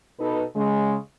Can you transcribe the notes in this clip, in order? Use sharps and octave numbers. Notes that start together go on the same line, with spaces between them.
B2 D#4 A4 B4
C#3 G#3